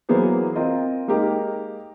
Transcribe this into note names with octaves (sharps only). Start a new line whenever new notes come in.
E3 F#3 A#3 B3 G#4 C5
C4 F4 A#4 D#5
G#3 A#3 D#4 G4 A#4